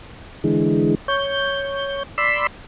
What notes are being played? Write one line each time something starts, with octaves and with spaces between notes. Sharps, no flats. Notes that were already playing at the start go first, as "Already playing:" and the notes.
D3 E3 G#3
C#5 G6
D5 B5 C6 E6